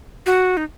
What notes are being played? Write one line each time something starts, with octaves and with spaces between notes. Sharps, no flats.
F#4
D#4